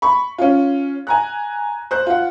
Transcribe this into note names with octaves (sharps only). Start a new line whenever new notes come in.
B5 C#6
C#4 F4
G#5 A#5 F#6
C5 F#6
F4 F#5